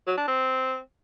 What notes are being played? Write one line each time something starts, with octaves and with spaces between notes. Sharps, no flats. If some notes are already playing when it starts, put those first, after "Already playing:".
F#3
D4
C4